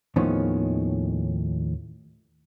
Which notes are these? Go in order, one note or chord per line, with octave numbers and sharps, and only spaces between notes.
D#2 A2 D#3 F3 B3 C#4